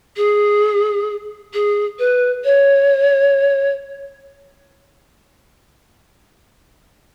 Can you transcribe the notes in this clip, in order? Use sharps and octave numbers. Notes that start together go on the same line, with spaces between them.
G#4
G#4
B4
C#5